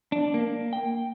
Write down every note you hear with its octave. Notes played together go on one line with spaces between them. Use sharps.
D4
A#3
G5